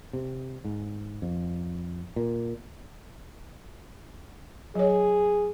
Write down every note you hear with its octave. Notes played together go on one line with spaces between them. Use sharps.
C3
G#2
F2
A#2
F#3 G#4 C#5